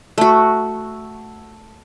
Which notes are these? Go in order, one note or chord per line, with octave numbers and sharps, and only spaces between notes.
A3 F#4